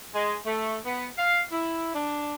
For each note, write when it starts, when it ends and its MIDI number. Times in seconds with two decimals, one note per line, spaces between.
0.14 0.36 56
0.46 0.77 57
0.85 1.07 59
1.18 1.42 77
1.52 1.92 64
1.95 2.35 62